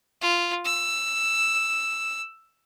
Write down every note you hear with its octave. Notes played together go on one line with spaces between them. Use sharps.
F4
E6